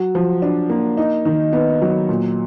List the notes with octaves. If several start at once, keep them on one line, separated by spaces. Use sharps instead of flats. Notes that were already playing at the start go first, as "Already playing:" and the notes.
Already playing: F#3 F#4
F3
D4
A#3
D#4
D#3
B3
F#3
A#2